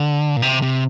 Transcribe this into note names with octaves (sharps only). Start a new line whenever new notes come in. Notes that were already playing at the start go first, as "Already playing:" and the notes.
Already playing: D3
A#2
C3
C3